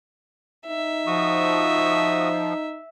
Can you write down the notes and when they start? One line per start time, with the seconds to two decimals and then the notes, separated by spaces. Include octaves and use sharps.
0.67 D#4 E5
1.07 F3 F#4 C#6 D#6